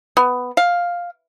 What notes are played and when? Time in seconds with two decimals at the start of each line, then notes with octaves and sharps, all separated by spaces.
0.17 B3
0.57 F5